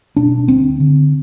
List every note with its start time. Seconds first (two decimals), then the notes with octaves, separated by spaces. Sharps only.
0.17 B2 D4
0.48 D2 C4
0.80 D3